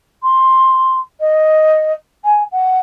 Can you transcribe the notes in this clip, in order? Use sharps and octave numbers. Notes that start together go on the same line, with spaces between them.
C6
D#5
G#5
F#5